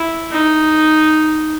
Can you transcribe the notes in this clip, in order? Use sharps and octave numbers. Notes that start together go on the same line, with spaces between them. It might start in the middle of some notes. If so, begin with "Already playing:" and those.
Already playing: E4
D#4